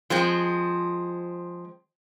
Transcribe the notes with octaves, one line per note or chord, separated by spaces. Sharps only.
F3 G#3 C4